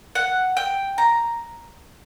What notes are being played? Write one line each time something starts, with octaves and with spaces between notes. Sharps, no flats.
F#5
G5
A#5